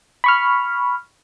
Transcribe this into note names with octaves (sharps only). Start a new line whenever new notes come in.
B5 C#6 F6